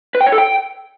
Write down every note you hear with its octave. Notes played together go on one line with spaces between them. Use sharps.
B4
G5
C#5
A4
G5